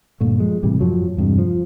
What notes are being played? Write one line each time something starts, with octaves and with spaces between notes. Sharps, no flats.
D2 G2 A#2 A3
F3 G#3
A2 C3 E3 G3
F#2 F3 F#3
E2 G2 C3 G#3
F3